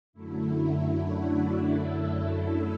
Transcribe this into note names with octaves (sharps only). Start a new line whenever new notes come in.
F#2 D3 F#3 A3 E4
E4
D4 F#4
E4 A4
F#2 D3 F#3 A3 E4 A4